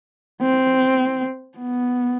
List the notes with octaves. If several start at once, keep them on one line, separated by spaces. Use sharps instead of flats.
C4
B3